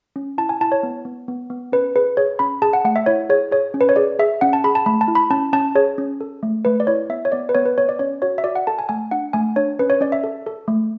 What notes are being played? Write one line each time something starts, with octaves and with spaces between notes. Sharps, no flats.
C#4
E4 A5
G#5
E4 A5
C#5
B3
B3
B3
B3
C#4 B4
G#4 B4
G#4 C#5
C#4 B5
G#4 A5
F#5
A3 F#5
E5
E4 C#5
G#4 C#5
G#4 C#5
C#4
B4
C#5
G#4 D5
G#4 E5
C#4 F#5
A5
G#4 B5
A5
A3 B5
A5
E4
B5
C#4 A5
C#4 A5
G#4 C#5
C#4
A4
A3
A3 B4
D5
E4 C#5
B3 E5
C#5
B3 D5
B4
B3 C#5
B4
B3 C#5
D5
C#4 C#5
F#4 C#5
E5
F#4 D5
F#5
A4 A5
G#5
A3 G#5
D4 F#5
A3 G#5
D4 C#5
C#4 B4
C#5
C#4 D5
E5
A4
A4
A3